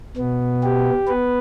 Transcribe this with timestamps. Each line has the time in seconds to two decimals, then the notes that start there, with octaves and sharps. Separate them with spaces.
0.17 B2 B3
0.63 G4
1.08 B3 B4